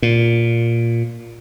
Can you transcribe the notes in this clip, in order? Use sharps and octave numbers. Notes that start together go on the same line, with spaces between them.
A#2